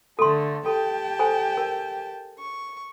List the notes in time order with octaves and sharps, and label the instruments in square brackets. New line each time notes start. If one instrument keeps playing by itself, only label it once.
[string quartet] D3 A3 [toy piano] A4 C6
[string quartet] G4 G5 A5 [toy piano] A4
[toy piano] A4 C5 G#5
A#4
[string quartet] C#6